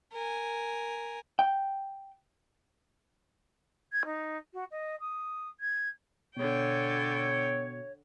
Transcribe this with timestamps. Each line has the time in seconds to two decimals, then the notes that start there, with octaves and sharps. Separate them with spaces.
0.13 A#4 G#5
1.39 G5
3.92 G#6
4.05 D#4
4.53 F#4
4.71 D#5
5.00 D#6
5.60 G#6
6.36 B2 D3 C#5 G5